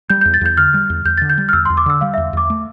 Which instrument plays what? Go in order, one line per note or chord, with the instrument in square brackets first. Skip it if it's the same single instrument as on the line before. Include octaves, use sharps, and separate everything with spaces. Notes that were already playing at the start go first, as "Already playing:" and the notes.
[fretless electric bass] G3 [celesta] G6
[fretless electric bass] E2 [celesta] G6
[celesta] A6
[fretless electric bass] E2 [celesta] G6
[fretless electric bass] D3 [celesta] F6
[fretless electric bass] G3
E2
[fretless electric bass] E2 [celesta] G6
[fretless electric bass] D3 [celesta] A6
[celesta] G6
[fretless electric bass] G3
[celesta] F6
[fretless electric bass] E2 [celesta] E6
[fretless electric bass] E2 [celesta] C6
[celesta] D6
[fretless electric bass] D3 [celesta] E6
[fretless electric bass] G3 [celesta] F5
[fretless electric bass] E2 [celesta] E5
[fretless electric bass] E2 [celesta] D6
[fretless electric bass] A3